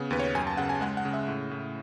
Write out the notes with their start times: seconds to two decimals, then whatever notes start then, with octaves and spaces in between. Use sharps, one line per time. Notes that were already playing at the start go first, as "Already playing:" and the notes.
Already playing: C#3 B3
0.11 D#2 B4
0.19 C#5
0.35 F#2 G#5
0.47 A5
0.57 C#3 F#5
0.69 G#5
0.81 G#3 F#5
0.97 F#5
1.05 C#3
1.13 E5
1.28 A2
1.51 A2